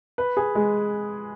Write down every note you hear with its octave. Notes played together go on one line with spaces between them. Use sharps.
B4
G#4
G#3